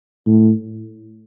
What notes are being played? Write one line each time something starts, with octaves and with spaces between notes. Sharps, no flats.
A2